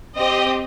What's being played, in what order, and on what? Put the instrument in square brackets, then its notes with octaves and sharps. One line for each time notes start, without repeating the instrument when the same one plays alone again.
[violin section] C4 G4 D#5